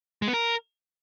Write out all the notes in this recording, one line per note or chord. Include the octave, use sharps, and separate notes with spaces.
G#3
B3
A#4